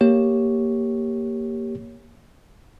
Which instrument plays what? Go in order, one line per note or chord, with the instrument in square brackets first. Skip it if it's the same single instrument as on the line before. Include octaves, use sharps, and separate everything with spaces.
[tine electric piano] A#3 G4 C#5